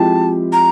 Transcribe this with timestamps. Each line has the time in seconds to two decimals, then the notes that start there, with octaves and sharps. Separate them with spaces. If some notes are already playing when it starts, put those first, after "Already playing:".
Already playing: F3 G#3 C4 E4 G4 A5
0.52 A#5